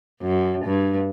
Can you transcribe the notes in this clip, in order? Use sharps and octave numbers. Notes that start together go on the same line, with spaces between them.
F#2
G2